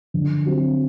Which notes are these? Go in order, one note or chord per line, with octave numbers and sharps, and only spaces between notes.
D3
F#3 C4